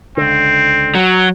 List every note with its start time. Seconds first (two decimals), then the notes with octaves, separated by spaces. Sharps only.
0.17 C#2 D3 C4
0.95 F#3